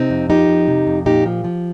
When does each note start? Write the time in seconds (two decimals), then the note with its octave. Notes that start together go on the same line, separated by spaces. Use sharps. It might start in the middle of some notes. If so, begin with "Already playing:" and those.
Already playing: C3 C4 D#4
0.10 F2
0.29 F3 D#4 G4
0.48 F2
0.68 C3
0.87 F2
1.06 A#2 D#4 G4
1.26 F3
1.44 F3